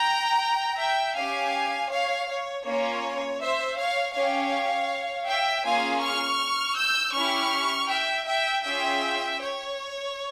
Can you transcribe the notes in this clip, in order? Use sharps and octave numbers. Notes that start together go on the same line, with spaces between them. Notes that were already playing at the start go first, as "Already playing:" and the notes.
Already playing: G5 A#5
E5 G5
C#4 G4 F5 G#5
C#5 F5
C#5
A#3 C#4 F4 C#5
C5 E5
C#5 F5
C#4 G4 C#5 F5
E5 G5
A#3 C#4 F4 G#4 F5 G#5
C#6 F6
E6 G6
C#4 E4 G4 C#6 F6
E5 G5
E5 G5
C#4 F4 G#4 E5 G5
C#5